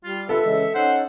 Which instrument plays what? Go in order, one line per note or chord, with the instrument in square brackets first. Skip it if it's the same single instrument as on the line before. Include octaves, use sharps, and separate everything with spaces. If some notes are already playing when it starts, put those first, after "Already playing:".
[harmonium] G3 [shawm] F4
[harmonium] F4 B4 [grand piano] A4 [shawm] E5
[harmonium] C#3 E3 G#3
[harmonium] C#4 D#4 [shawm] C5 [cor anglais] F#5